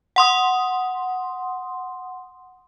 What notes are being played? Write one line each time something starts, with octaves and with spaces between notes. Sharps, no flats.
F#5 C6 D#6